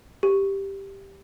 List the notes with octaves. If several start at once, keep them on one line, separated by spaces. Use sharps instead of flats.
G4